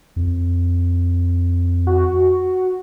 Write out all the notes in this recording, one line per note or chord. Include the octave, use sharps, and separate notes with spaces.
F2
F#4